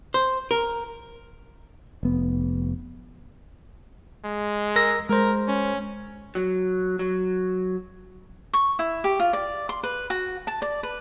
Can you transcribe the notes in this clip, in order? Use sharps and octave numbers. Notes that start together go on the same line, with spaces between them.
C5
A#4
F1 B3
G#3
A#4 E6 A#6
G#3 A#4 C5
C#4
F#3
F#3
C#6
E4
G4
F4
D5
C6
B4
F#4
A5
D5
B4